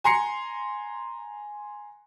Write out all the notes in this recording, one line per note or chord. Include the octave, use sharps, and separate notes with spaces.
G#5 A#5 C6 C7 C#7